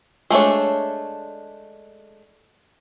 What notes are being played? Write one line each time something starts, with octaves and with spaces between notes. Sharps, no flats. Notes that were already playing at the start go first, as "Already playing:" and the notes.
G#3 A3 D4 C#5